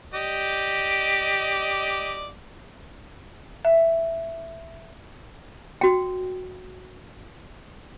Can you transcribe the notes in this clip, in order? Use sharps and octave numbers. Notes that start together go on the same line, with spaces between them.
G4 D5 D#5
E5
F#4 G5